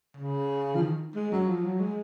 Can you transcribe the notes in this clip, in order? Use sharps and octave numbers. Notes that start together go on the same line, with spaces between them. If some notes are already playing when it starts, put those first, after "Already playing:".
C#3
F3
D#3
G#3
F#3
F3
F#3
G#3